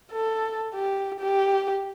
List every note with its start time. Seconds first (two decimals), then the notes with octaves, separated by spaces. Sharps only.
0.12 A4
0.75 G4
1.20 G4